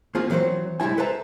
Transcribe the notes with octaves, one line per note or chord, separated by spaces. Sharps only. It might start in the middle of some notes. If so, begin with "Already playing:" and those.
A#3 C4 C#4 F4 G#4
E3 F#3 C4 A#4 C5 C#5
C3 G3 G#3 E4 G#5
A4 B4 C5 E5 A5 A#5